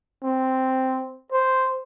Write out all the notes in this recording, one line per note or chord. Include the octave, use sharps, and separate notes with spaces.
C4
C5